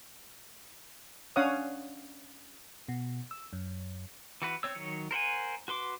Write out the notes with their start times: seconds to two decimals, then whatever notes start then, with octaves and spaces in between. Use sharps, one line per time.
1.36 C#4 D4 C#5 F5 F#5 D#6
2.88 B2
3.31 E6
3.53 F#2
4.42 E3 F#4 B4
4.63 C4 C#5 E6
4.75 D#3 F#3 C#5
5.11 A#4 C5 F#5 G#5
5.68 F#4 B4 C6 D6